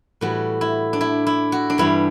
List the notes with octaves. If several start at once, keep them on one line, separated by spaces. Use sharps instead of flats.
A2 E3 G3 F#4
E4
D4
E4
E4
F#4
D4
G2 E3 G3 E4